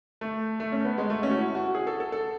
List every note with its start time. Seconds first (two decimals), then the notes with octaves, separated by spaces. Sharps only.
0.21 A3
0.60 A3
0.72 C#4
0.85 B3
0.98 G#3
1.10 A3
1.23 C#4
1.30 F#4
1.36 E4
1.55 F#4
1.75 G#4
1.87 A4
2.00 A4
2.12 A4